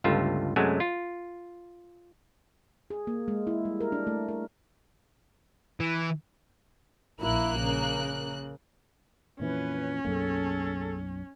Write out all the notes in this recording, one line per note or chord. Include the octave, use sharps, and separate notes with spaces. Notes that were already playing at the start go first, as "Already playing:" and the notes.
G1 C#2 G2 A3 F4 E5
F#2 C3 F#3 G#3 A3 G#5
F4
G#4
A#3
G#3
E4
G3
A#4
D4
A3
A#4
E3
A#1 A#3 E4 F#6
C#3
F2 A#2 E3 C#4 B4 C#5
B1 F#2 A#3 G#4 A4